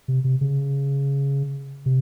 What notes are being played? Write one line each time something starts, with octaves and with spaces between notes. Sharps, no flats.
C3
C3
C#3
C3